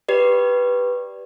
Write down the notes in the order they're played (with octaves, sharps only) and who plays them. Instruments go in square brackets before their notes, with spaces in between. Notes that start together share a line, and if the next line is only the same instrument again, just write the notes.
[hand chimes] G4 B4 D5